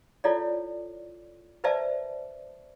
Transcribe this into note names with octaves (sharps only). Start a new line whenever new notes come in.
E4 F4 A4 C#5 D5
B4 C5 D5 E5 A5